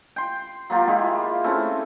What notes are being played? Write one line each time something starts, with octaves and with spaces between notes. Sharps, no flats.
G5 C6
F#3 A#3 F4 G4
G#3 E4 F4 G4
A3 C4 C#4 E4